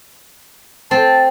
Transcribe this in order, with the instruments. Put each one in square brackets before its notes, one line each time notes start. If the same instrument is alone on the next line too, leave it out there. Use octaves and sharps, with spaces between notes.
[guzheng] C4 [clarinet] A5